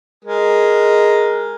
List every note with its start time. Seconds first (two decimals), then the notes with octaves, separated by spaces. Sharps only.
0.25 G#3 A#4